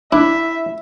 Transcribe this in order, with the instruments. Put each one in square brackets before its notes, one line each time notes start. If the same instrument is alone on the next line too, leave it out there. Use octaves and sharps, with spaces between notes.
[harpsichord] D4 [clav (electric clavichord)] E4 [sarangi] E5